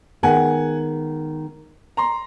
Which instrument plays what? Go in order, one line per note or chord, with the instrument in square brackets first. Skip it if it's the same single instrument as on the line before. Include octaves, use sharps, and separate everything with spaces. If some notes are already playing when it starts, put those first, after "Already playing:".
[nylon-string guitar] D#3 G#3 B3 [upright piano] F#5 G#5
[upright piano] A#5 C6